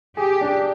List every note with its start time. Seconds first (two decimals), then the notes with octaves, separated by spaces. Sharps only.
0.17 G4 G#4
0.41 D4